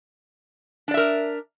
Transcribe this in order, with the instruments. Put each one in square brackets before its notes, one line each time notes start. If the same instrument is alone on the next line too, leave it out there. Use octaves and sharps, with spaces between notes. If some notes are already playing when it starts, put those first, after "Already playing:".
[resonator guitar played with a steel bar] D4
D5
E5
A#4